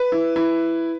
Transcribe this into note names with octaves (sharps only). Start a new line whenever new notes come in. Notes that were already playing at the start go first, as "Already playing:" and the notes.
Already playing: B4
E4
E4